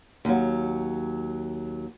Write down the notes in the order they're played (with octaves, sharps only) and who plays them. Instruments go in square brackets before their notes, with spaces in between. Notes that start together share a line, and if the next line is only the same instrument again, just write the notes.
[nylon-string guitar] D#2 F#3